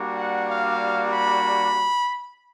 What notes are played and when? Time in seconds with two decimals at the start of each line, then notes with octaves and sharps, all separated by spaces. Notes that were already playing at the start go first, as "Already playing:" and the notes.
Already playing: G3 A#3 D4 F#4
0.17 F#5
0.49 F5
1.12 B5